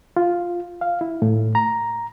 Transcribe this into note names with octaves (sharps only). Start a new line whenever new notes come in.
F4
F5
E4
A2
A#5